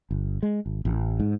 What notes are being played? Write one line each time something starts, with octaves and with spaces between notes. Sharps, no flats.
G1
G#3
G#1
A1
G#2